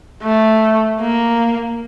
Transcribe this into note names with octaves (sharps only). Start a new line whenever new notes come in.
A3
A#3